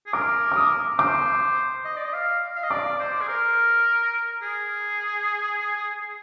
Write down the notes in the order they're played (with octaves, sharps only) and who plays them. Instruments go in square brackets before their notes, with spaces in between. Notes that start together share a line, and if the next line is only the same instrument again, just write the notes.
[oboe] G#4
[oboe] A#4 [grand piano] D6
[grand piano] D6
D#6
[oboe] C5 [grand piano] D6
[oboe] D#5
D5
D#5
F5
F5
D#5
[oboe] D5 [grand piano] D6
[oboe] C5
G#4
A#4
G#4